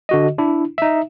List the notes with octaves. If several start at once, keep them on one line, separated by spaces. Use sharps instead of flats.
D3 F#4 D#5
D4 E4
D#4 E5